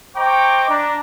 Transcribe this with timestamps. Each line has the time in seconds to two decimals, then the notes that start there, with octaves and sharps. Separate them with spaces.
0.15 C5 D#5 G5 A#5 C#6 D6
0.68 D4 A#5